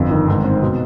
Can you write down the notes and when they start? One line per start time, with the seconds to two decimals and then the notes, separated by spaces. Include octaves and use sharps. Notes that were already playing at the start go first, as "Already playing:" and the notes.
Already playing: G1 F2
0.10 D#3
0.28 G#2
0.44 C4
0.61 B2